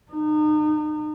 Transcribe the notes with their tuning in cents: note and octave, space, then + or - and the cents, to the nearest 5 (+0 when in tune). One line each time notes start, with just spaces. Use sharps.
D#4 -35